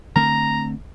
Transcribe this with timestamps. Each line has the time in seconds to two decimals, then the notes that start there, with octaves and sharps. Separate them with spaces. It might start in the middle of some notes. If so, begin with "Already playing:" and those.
0.16 D3 A3 C4 A#5